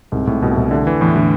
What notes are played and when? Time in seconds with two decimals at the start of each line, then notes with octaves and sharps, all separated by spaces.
0.12 C2 G#2
0.27 C2 A2
0.42 C2 B2
0.57 C2
0.71 D3 A3
0.86 E2 E3
1.01 E2 A2
1.16 A2 D3